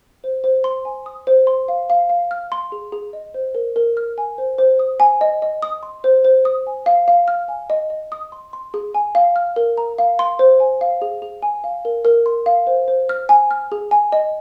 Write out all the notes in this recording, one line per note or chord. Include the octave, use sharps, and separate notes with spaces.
C5
C5
C6
G#5
D#6
C5
C6
F5
F5
F5
F6
C6
G#4
G#4
D#5
C5
A#4
A#4
F6
G#5
C5
C5
D#6
G#5
D#5
D#5
D#6
C6
C5
C5
D#6
G#5
F5
F5
F6
G#5
D#5
D#5
D#6
C6
C6
G#4
G#5
F5
F6
A#4
A#5
F5
C6
C5
G#5
F5
G#4
G#4
G#5
F5
A#4
A#4
C6
F5
C5
C5
F6
G#5
F6
G#4
G#5
D#5